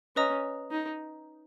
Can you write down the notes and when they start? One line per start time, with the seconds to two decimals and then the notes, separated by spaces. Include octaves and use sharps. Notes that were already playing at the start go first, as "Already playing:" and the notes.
0.16 C#4 B4 D#5 A#5 D#6
0.71 D#4